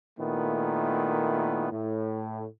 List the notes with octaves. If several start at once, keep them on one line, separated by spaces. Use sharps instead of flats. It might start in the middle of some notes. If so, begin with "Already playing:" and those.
A#2 D#3 A3 B3 E4
A2